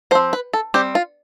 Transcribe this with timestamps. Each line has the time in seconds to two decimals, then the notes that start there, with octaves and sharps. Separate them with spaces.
0.11 F3 C5
0.15 C4
0.33 B4
0.53 A4
0.74 G3 C4 G4
0.95 F4